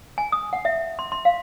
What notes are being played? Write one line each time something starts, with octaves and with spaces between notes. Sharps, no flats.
G#5
D#6
F#5
E5
C6
C6
F5